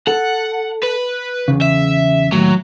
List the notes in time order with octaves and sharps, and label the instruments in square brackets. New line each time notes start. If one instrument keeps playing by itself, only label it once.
[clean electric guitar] A4 [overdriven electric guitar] F#5
[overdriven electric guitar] B4
[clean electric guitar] E2 C#3
[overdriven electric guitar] E5
[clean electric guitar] D#2 A2 [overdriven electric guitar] F#3